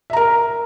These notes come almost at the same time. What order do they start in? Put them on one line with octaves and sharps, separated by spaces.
E5 A#5 A#4